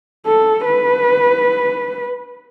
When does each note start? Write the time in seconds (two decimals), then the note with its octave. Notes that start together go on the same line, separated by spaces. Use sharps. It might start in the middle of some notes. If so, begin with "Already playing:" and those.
0.26 A4
0.65 B4